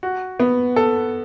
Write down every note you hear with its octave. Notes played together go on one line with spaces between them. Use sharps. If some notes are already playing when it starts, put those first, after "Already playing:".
F#4
B3
A4